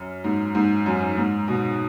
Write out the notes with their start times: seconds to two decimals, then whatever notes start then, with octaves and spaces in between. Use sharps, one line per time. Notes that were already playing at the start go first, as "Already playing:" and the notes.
Already playing: F#2
0.24 G#2
0.55 G#2
0.86 F#2
1.17 G#2
1.48 B2